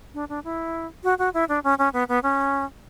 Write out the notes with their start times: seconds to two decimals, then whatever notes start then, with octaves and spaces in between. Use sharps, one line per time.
0.14 D4
0.29 D4
0.44 E4
1.04 F#4
1.19 F#4
1.34 E4
1.49 D4
1.64 C#4
1.78 C#4
1.93 B3
2.09 B3
2.23 C#4